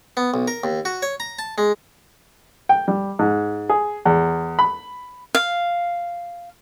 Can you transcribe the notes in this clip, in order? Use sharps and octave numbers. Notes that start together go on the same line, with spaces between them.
B3
B1
A#4
D#2
F#4
C#5
A#5
A5
G#3
G5
G3
G#2
G#4
E2
B5
F5